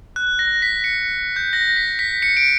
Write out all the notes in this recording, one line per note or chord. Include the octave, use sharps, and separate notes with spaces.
F#6
A#6
B6
C#7
G6
A#6
B6
B6
C#7
D7